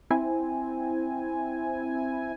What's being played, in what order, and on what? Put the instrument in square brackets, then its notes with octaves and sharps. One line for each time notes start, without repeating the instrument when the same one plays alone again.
[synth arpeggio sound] C4 E4 G#5